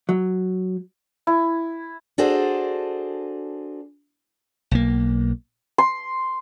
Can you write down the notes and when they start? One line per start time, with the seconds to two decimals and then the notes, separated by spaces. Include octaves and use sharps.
0.09 F#3
1.27 E4
2.18 D4 F#4 G#4 A4 C5
4.71 B1 A#3
5.78 C6